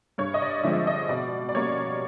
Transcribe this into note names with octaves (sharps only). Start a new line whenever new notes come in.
G2 C#5
D#5
D5
D3 F3 G#3 C4 E5
D#5
B2 D5
D5
G3 A#3 C#4 C#5